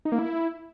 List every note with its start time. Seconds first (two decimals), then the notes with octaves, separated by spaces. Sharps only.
0.05 D#4
0.12 A#3
0.19 E4